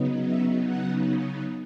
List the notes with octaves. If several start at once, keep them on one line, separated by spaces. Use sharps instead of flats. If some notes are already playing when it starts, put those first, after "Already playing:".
Already playing: C#3 F#3 B3 D#4
E5
F#5